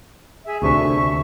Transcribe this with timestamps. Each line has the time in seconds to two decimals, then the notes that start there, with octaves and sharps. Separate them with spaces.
0.46 G#4 E5
0.62 D2 C3 D4 E5 C#6